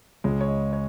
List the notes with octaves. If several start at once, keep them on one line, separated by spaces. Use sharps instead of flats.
C#2 C#3 G#3
C#5
D#5
C#5